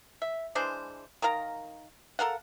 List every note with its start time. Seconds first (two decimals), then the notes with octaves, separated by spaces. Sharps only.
0.22 E5
0.55 E3 G#3 D4 C5
1.22 D#3 A#4 F5 A#5
2.19 A4 A#4 F5 F#5